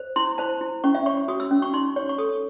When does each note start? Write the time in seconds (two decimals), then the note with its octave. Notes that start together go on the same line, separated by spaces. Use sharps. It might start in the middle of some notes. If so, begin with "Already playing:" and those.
Already playing: C5
0.16 E4 C6
0.38 C5 A5
0.61 E4
0.84 C#4 C#6
0.95 E5
1.06 C#5 C#6
1.17 C#6
1.28 F#4 D#6
1.40 E6
1.51 C#4
1.62 C#6
1.73 D#4 C6
1.96 C#5 C#6
2.09 C#6
2.18 A4 D#6